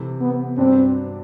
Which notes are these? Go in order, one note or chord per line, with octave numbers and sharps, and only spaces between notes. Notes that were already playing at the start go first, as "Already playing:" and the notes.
Already playing: C3 E3 A3 E4
B3
G2 F#3 B3 C4 D4